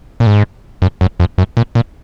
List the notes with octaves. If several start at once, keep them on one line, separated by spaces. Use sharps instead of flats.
A#2
G#2
F#2
F#2
F2
F#2
A#2
A#2